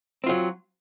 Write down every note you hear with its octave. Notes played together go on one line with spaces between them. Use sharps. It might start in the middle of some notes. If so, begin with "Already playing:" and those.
F#3 C4 F4